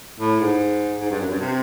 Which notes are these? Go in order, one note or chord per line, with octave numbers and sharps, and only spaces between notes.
A2
G#2
G#2
G2
F#2
G2
C3